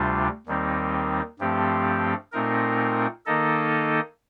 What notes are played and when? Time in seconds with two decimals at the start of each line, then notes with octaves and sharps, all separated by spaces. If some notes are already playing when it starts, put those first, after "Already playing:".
Already playing: D2 C3 G3 D4 F4
0.46 D#2 D#3 G3 C4 D#4
1.39 G2 F3 A3 C4 G4
2.32 A#2 A3 C4 D#4 A#4
3.26 D#3 A#3 D#4 A4 D#5